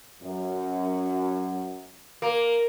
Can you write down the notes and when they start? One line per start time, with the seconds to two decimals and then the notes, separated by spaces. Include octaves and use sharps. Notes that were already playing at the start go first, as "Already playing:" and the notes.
0.22 F#2
2.22 A#3